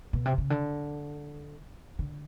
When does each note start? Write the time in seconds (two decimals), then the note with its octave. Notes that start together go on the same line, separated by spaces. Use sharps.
0.13 B2
0.26 C3
0.38 C#3
0.50 D3
1.99 D3